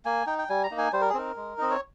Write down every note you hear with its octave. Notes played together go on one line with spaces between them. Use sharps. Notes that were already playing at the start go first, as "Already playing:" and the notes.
A#3 G#5
D#4 G5
G5
G3 G#5
A#5
A#3 D#4
G#5
G3 C5
A#4
G#4
C4 D#4 A#4
G#3
C4 D#4 D#5
C#5